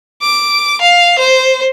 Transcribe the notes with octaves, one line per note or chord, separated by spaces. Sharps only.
D6
F5
C5